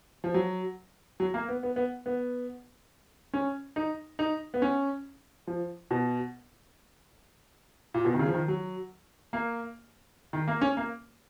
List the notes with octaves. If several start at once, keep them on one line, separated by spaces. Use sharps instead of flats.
F3
F#3
F#3
A#3
B3
B3
B3
B3
C#4
D#4
D#4
B3
C#4
F3
B2
A#2
B2
D#3
C#3
F3
D#3
F#3
A#3
D#3
A#3
C#4
A#3